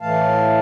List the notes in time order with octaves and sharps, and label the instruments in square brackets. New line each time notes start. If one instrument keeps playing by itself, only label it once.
[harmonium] A2 E3 A3 F5 A5